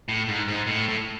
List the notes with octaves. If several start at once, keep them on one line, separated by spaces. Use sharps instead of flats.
A2
G#2
G#2
A2
A2